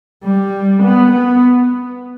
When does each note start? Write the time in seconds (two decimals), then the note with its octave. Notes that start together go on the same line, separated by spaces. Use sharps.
0.24 G3
0.83 B3
1.13 B3